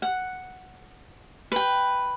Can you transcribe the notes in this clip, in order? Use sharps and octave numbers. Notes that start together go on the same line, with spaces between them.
F#5
B4 G5